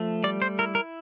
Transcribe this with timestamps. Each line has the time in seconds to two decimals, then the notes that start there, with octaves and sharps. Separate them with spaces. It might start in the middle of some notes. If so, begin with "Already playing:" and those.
Already playing: F3 A3
0.24 G3 D5
0.42 C5
0.59 E4 A#4
0.75 A#4